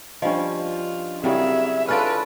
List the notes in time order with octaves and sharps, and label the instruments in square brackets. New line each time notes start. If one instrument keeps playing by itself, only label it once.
[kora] F3 G3 C#4 [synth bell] D4 D#5
[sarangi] F4
[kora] C#3 F#3 G3 [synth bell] C4 E4 G4 [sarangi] G#4 [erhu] E5
[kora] C#4 D4 F4 [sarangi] A4 [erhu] B4 [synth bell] F6 A6 D7